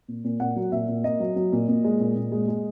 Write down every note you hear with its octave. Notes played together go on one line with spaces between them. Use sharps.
A#2
A#2
A#2 F#5
F#3
A#2 E5
A#2
A#3 D#5
F#3
F#3
A#2
A#2
G#3
A#2
A#2
G#3
G#3